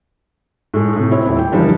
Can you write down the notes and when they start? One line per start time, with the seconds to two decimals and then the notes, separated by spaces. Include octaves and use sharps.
0.74 A2 G#3 A3
0.96 A2 C3
1.11 C4 E4 C#5
1.25 D#1 E4
1.39 G5
1.52 F#1 E3 F3 G3 D4